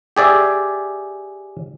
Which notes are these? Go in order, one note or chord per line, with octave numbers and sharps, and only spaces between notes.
G4 G#4 D5 E5